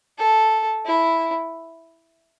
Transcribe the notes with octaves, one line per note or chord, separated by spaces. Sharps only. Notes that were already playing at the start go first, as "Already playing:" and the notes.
A4
E4